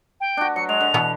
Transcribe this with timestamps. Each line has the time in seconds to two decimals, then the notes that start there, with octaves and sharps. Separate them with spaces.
0.20 G5
0.37 D4 F#4
0.56 F#3 C#7
0.69 G#3 F7
0.81 D3
0.94 B2 E3 B3